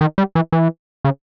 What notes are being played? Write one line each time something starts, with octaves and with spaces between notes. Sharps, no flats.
D#3
G3
E3
E3
C#3